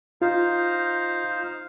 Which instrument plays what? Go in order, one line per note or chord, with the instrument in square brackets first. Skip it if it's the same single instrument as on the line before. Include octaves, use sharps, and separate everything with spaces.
[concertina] D#4 C5 F5 [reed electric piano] F4